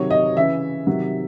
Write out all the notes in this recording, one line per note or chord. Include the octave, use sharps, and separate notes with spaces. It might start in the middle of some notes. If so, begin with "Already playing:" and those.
Already playing: C3 D#3 F#3 C#5
D#5
C#3 E3 E5
C3 D#3 F#3